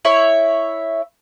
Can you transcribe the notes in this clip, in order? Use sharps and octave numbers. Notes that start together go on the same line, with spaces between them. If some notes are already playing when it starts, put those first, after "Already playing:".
E4 C#5 E5